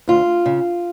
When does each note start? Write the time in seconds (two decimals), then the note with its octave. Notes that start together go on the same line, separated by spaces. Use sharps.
0.08 D2 F4
0.46 C#3